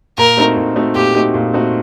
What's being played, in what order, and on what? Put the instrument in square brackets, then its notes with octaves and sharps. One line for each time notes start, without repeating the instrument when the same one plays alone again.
[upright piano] A#2 [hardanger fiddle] A#4
[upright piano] A3 C4 D#4 F#4
A#2
A3 C4 D#4 F#4
[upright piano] A#2 [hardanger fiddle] G4
[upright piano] A3 C4 D#4 F#4
A#2
A3 C4 D#4 F#4